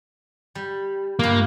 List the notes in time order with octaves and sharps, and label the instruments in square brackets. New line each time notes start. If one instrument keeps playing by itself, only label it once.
[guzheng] G3
[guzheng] G2 F4 [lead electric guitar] A#3